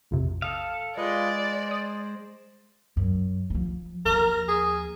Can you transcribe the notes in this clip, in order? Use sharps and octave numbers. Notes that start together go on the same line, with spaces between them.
A#1 F2 C3
A4 F5 D#6
G#3 F4 B4 D5 D#5
C5
D#6
F#2
F3 G3
D#2 F3 A#4
G#4